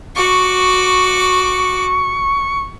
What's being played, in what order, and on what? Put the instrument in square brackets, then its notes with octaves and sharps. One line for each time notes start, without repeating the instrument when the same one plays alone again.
[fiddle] F#4 D6 [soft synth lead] C#6